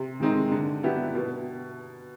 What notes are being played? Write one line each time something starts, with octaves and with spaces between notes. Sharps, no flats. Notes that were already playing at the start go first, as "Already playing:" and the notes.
Already playing: C3
D#3 G#3 C4 D#4
D3
F#3 B3 E4 G4
B2